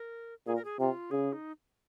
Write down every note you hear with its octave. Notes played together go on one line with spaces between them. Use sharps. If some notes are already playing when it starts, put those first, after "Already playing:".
Already playing: A#4
A#2 G#4
A#4
G#4
C3 F4
C#3 G#4
D#4